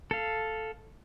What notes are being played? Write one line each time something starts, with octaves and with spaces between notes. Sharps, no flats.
A4 F5